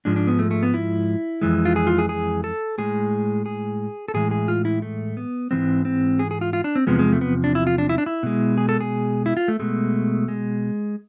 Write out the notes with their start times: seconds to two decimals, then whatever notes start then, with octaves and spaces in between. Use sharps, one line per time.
0.05 G#2 F3 G#3 D4
0.16 D4
0.27 B3
0.39 A3
0.51 A3
0.63 B3
0.74 E4
1.41 F2 E3 G#3
1.65 F4
1.76 G#4
1.87 F4
1.98 G#4
2.09 G#4
2.44 A4
2.78 A2 G#3 G#4
3.46 G#4
4.08 A4
4.14 A2 E3 G#3 G#4
4.31 G#4
4.48 F4
4.65 E4
4.82 A3
5.17 B3
5.51 G#2 E3 G#3 C4
5.85 C4
6.19 G#4
6.31 G#4
6.41 F4
6.53 F4
6.64 D4
6.76 C4
6.87 E2 C3 F3 G#3 B3
6.99 G#3
7.12 A3
7.21 B3
7.44 D4
7.55 E4
7.67 F4
7.78 D4
7.89 E4
7.98 D4
8.06 E4
8.23 B2 G#3
8.58 G#4
8.69 A4
8.80 G#4
9.26 E4
9.37 F4
9.48 A3
9.60 B2 G#3 A3
10.28 G#3